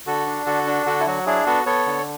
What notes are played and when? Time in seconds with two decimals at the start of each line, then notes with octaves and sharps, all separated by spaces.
0.07 D3 F#4 A4
0.26 D4
0.46 D3 F#4 A4
0.67 D4
0.86 D3 F#4 A4
1.00 E4
1.07 F#3 F#4
1.26 D4 E4 G#4
1.46 B3 F#4 A4
1.66 B3 A4 C#5
1.86 D3